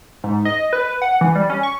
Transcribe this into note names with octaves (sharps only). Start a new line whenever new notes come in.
G#2
D#5
B4
F#5
E3
G3
C#4
C#6